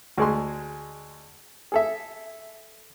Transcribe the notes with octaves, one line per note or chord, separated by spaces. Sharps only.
D2 G#3 C6
G#4 A4 E5